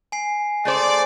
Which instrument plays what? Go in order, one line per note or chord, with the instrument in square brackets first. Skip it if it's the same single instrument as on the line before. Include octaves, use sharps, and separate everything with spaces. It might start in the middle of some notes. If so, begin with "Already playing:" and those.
[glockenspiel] G#5 C7
[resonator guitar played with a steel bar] A3 G#4 C5 [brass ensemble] D5